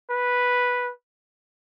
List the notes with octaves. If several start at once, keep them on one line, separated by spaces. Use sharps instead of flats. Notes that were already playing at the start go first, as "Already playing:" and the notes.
B4